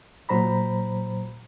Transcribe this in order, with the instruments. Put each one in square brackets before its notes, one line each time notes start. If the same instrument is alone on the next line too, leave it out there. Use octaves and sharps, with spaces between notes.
[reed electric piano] A#2 F#3 C5 A#5 B5